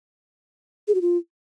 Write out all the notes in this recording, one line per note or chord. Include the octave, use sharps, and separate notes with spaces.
G#4
F#4
F4